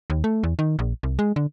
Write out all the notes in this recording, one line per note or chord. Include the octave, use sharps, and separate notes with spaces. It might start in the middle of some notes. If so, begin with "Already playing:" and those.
D#2
A3
E2
D#3
A#1
C2
G#3
D3